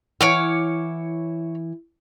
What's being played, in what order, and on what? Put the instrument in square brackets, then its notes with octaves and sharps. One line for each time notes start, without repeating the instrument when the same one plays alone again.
[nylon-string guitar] E3 E4 F#5 [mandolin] C#5 D6 F6